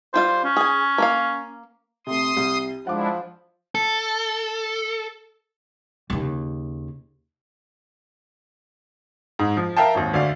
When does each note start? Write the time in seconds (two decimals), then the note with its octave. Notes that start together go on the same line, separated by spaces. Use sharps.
0.14 G3 F4 C5 F5
0.44 C#4
0.56 G#4 G#5
0.98 A#3 A#4 F5
2.07 C3 A3 C6 D#6
2.37 C2
2.87 F3 G#3 D4 E4 F#5 D6
3.75 A4
6.10 D#2 C#3
9.39 G#2
9.57 F3
9.77 A#4 E5 F5 G5 A5
9.95 G#1 D#2
10.14 D2 D5 F5